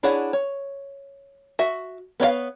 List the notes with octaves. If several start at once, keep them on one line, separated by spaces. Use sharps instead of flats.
D4 E4 G#4 C#5 F#5
C#5
F#4 E5
B3 C#5 D5 F5